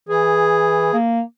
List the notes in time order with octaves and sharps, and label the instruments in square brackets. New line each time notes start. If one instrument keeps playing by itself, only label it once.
[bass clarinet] E3 [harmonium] G#4
[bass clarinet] A#3